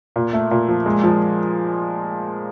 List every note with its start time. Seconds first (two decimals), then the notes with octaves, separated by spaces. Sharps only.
0.16 A#2
0.33 A3
0.51 A#2
0.68 F3
0.86 G#3
1.03 F3